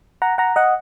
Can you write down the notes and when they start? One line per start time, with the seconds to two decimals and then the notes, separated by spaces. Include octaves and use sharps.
0.22 F#5 A#5
0.38 F#5 A#5
0.56 D#5 F#5